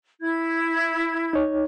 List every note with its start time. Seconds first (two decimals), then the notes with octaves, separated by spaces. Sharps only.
0.21 E4 G#6
1.33 D#4 C#5